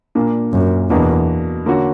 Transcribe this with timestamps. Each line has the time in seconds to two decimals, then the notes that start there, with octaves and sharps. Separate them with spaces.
0.15 A#2 A#3 D4
0.53 F#2
0.90 E2 B2 A#3 D4 F#4
1.66 D3 A#3 C#4 F#4